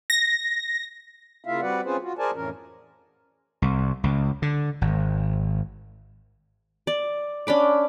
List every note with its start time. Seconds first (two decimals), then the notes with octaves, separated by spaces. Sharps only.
0.10 A#6
1.45 C#3 A#3 E4 F4 E5 F5
1.61 G3 C4 F#4 B4 D5 F#5
1.85 C4 C#4 F4 G#4 B4 C5
2.02 F4 F#4
2.19 G#4 A#4 C5 D5 G#5 A5
2.35 F2 A2 E3 C#4 A#4
3.62 C2
4.04 C#2
4.42 D3
4.81 G#1
6.87 D5
7.47 C#4 D4 B5 D6